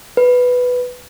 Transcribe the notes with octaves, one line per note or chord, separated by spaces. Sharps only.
B4